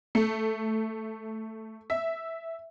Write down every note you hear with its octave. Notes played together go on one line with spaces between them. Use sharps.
A3
E5